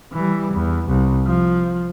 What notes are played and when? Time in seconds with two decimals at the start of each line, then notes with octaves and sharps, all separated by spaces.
0.13 E3 G3
0.53 E2
0.87 C2
1.26 F3